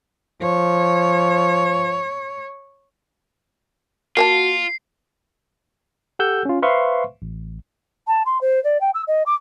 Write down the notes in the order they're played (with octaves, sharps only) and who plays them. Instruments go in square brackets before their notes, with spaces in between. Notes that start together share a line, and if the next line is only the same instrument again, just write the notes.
[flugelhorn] F3 [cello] C#5
[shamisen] A#3 G#5 A5 [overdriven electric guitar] F4 [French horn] F#4 [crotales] C7
[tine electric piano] G4 A4 F#5 E6 F#6 G6
C#4 F4
B4 C5 E5 F5 C6 C#6
A1
[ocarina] A5
C6
C5
D5
G5
E6
D#5
D6